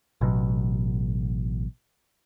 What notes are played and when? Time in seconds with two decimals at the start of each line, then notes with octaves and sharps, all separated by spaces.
0.21 A1 B2 F#3